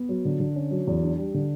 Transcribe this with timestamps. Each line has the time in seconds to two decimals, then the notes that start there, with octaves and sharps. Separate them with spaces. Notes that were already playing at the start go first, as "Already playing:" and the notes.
Already playing: B3
0.09 F#3
0.25 D3
0.40 D3
0.56 C#4
0.71 F#3
0.87 E2
1.03 D4
1.18 G3
1.34 D3